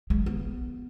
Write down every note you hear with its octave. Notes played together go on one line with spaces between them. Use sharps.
G#3
B3